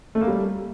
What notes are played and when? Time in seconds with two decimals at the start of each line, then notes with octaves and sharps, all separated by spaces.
0.15 A3
0.21 A#3
0.27 G3